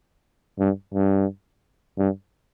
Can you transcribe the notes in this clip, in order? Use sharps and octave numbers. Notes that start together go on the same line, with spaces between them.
G2
G2
G2